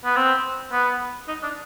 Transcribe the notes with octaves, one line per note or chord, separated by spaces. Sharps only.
B3
C4
B3
D#4
D4